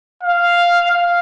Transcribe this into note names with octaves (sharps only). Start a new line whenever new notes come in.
F5
F5